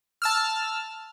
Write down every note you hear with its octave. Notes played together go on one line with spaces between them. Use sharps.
A5 E6 F6